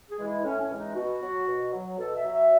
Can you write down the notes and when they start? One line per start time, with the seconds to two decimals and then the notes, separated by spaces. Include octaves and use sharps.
0.10 G#4
0.18 E3 G#3
0.26 E4
0.44 A2 C#4
0.61 C#4
0.69 E3 G#3
0.78 D#4
0.95 B2 F#4
1.22 F#3
1.47 B2
1.72 F#3
1.98 B2 A4
2.16 E5
2.24 F#3
2.33 E5